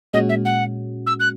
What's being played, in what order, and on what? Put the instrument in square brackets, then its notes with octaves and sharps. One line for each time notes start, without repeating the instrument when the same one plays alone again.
[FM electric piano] A#2 G#3 C#4 F#4 [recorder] D#5
[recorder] E5
F#5
E6
F#6